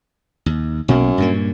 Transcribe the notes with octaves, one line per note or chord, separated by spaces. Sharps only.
D#2
B1 F#2 B2 A#3
G2 A#2 A#3